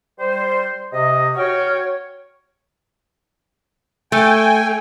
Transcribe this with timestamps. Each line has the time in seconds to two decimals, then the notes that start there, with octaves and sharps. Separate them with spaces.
0.20 G3 C5
0.93 C3 D#5
1.37 F#4 C#5 G5 F6
4.12 A3 G5 G#5